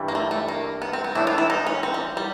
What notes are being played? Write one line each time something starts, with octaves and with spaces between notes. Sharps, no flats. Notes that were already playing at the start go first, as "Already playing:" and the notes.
Already playing: G2 E3 G3
A#3
A3
A3
A#3
B3
C4
B3
A2 E3 A3 D4 E4
F4
E4
D#4
C#4
C4
G3
G3